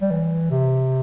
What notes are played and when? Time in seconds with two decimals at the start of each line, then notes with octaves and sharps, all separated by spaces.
0.01 G3
0.11 E3
0.51 C3